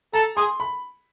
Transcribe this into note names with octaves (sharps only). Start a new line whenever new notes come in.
A4 A#5
G#4 C6
B5